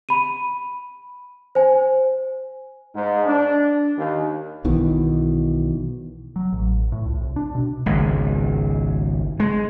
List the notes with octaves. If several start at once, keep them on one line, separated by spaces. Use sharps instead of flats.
B5 D#7
C5 G#5
G#2
D4
D#2
B1 B2 D#3 E3
F#3
A1
A2
C#2
C2
D4
B2
G#1 C#2
G#3